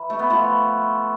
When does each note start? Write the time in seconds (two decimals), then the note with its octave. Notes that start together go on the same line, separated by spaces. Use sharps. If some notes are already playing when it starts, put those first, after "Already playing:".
Already playing: E3
0.10 A3
0.19 B3
0.30 F3 A3